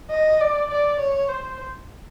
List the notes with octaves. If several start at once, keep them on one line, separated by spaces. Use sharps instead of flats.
D#5
D5
D5
C#5
C5